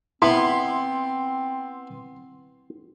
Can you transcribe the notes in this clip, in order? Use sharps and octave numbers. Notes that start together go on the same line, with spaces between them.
B3 C4 E4 F#5 C6